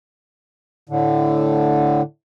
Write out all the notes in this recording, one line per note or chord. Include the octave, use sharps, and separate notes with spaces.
A2 D3